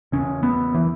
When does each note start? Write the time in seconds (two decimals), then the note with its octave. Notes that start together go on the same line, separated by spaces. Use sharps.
0.12 E2 C#3 C#4
0.43 B3
0.74 E3